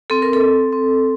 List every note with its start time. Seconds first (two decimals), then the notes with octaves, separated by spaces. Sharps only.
0.10 C4 A4
0.22 A#4
0.33 A4
0.41 C4
0.72 C4